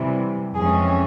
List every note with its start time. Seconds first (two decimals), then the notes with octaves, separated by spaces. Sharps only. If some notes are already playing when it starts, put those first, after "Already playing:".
Already playing: C3 E3 G3
0.54 F2 E3 G#3 C#4 G#4